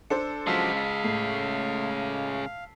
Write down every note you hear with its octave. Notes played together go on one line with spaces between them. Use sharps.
D4 A4 C5 C#7
C#3 F3 F#3 G#3 F5 A5 E6 B6
F5
A2 C7